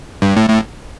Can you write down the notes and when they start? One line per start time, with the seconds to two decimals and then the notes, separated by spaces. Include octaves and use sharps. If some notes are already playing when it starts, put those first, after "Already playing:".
0.22 G2
0.36 A2
0.50 A2